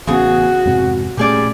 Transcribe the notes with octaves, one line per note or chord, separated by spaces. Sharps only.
A1 C#3 B3 F#4 G#4
F2 G#2 C3
A#2 G3 A3 C#4 G#4 D5